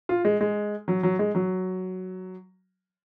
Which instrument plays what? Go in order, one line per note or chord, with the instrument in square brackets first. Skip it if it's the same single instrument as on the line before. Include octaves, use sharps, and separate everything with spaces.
[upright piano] F4
G#3
G#3
F#3
F#3
G#3
F#3